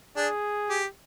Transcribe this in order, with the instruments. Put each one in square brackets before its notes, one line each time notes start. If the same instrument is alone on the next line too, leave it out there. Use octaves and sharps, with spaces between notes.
[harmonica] D4 [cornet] G#4
[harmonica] G4